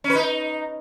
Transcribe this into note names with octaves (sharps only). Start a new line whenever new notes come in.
C#4
B4
D#4